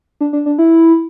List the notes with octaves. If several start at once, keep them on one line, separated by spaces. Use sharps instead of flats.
D4
D4
D4
E4